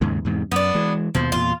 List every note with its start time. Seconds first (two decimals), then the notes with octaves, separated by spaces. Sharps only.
0.01 D#2 G#2 C#3
0.25 E2 G#2 C3
0.52 F#2 B3 D4
0.75 E3 G#3
1.15 D#2 B2 F3
1.32 E2 A#2 F4